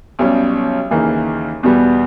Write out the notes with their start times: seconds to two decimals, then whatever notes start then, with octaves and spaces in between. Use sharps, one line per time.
0.19 B1 B2 G3 C#4
0.91 D#2 C#3 E3 A#3 D#4
1.63 E2 B2 G3 B3